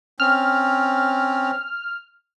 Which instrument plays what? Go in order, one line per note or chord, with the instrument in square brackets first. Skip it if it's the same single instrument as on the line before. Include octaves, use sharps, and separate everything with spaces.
[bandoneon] C4 C#4 [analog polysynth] F6